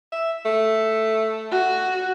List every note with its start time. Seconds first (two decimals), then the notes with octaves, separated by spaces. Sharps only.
0.12 E5
0.46 A3
1.52 F#4